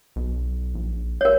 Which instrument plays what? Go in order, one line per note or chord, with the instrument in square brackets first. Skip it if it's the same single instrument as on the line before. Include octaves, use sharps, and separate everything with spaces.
[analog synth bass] B1
A#1
[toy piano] A#4 C#5